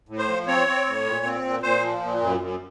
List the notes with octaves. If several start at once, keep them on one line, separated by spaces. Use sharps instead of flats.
A2
C5
F3
C4 C#5
C4
A2
A#2
C4
A#2
A#2 C5
F3
A#2
F#2
F#2